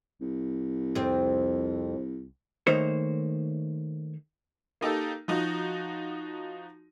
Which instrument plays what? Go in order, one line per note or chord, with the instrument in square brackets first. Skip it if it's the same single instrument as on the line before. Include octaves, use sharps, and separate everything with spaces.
[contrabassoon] C2
[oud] F2 C4
[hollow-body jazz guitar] D#3 A3 A#3 D#4 C5 C#5
[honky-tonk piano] A#3 D#4 G4 A4
F3 D#4 F#4